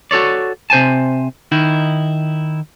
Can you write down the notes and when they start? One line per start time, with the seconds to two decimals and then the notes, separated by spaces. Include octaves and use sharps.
0.11 F#4 A4 C#5 D5
0.70 C3 C5 G#5 A5
1.52 D#3 D#4 E4